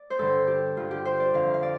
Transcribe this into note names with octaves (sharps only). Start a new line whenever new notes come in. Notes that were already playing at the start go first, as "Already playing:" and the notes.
Already playing: D5
C5
G2 D3 A4
G4
G2 D3 F4
G4
C5
D5
F2 D3 F5
F5
D5